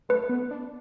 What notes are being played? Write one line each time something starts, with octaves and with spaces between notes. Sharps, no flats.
A3 B4
B3
D4